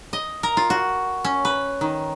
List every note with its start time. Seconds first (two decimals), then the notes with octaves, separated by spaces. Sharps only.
0.13 D#5
0.43 A#4
0.57 F4
0.70 F#4
1.24 C#4
1.45 B4
1.81 D#3